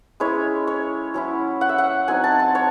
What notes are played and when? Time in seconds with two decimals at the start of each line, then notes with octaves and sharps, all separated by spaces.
0.20 G#3 C#4 E4 C#5
0.67 C#5
1.14 F#3 C#4 E4
1.61 F#5
1.69 E5
1.78 F#5
2.08 F#3 C4 D#4 G#5
2.24 A5
2.39 C6
2.55 C#5